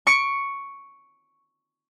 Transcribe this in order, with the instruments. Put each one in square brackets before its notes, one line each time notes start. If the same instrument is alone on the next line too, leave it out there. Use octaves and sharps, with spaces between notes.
[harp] C#6 C#7 D7